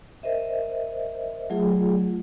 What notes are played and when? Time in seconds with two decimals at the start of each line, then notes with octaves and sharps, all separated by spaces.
0.23 A#4 C5 D#5 E5
1.50 F#3 A3 F4 G#4